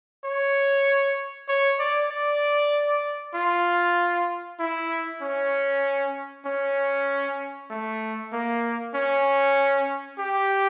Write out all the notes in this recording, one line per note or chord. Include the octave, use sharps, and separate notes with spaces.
C#5
C#5
D5
D5
F4
E4
C#4
C#4
A3
A#3
C#4
G4